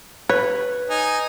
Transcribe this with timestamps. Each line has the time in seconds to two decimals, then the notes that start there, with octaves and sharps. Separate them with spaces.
0.29 B4 C#5
0.90 D#4 G#5